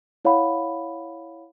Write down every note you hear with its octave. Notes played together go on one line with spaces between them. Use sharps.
E4 C#5 F5 F#5 B5